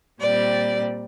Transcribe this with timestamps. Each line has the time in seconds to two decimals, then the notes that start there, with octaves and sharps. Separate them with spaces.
0.20 A#2 G3 C4 D5